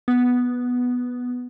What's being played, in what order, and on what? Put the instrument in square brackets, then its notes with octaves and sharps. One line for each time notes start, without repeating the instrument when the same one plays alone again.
[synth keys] B3